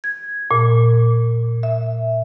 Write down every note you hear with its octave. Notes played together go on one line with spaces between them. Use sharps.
G#6
A#2
E5